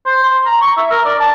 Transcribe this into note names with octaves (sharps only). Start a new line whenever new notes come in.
C5
C6
A#5
C#6
E5
A#4
D5
A5